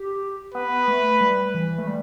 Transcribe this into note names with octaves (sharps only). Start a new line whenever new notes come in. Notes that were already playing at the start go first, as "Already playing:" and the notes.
Already playing: G4
B3 B4
A3
G3
E3
A3
G3